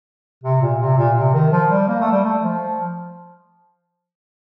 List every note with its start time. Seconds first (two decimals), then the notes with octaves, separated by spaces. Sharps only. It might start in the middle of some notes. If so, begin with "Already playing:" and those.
0.44 C3
0.61 A#2
0.80 C3
0.97 A#2
1.16 C3
1.34 D#3
1.52 F3
1.71 G3
1.88 A#3
2.00 A3
2.12 G3
2.24 A3
2.42 F3